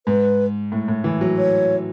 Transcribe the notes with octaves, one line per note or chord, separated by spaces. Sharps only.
G#2 B4
A2
A2
E3
F#3
C#5